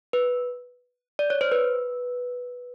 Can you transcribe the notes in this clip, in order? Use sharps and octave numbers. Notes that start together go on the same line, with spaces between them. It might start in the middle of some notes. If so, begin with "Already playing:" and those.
B4
D5
C#5
C5
B4